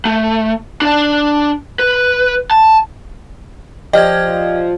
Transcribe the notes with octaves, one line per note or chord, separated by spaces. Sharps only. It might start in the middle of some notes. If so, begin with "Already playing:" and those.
A3
D4 D5
B4
A5
F3 G4 D5 D#5 F6 G#6